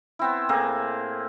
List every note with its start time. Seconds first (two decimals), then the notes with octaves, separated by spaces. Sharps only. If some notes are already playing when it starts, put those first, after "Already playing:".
0.19 B3 C4 E4
0.49 A2 A#3 C4 G#4